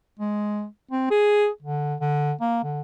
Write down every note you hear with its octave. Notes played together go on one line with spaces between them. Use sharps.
G#3
C4
G#4
D3
D3
A#3
D3